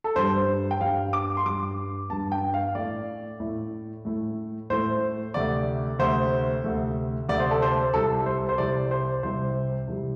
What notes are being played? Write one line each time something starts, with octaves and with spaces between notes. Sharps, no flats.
A4
G2 G3 C5
G5
G2 G3 F5
D6
C6
G2 G3 D6
G2 G3 A5
G5
F5
A2 A3 D5
A2 A3
A2 A3
A2 A3 C5
D2 C3 A3 D5
D2 C3 A3 C5
D2 C3 A3
D2 C3 A3 D5
C5
A4
C5
C2 C3 G3 A4
C5
C5
C2 C3 G3 D5
C5
C2 C3 G3 C5
C2 C3 G3